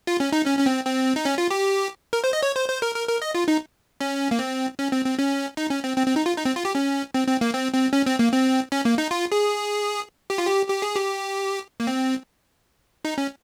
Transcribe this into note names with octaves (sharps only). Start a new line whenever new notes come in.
F4
C#4
D#4
C#4
C#4
C4
C4
D#4
C#4
F4
G4
A#4
C5
D#5
C#5
C5
C5
A#4
A#4
A#4
D#5
F4
D#4
C#4
A#3
C4
C#4
C4
C4
C#4
D#4
C#4
C4
C4
C4
D#4
F4
D#4
C4
F4
G4
C#4
C4
C4
A#3
C4
C4
C#4
C4
A#3
C4
C#4
A#3
D#4
F4
G#4
G4
F4
G4
G4
G#4
G4
A#3
C4
D#4
C#4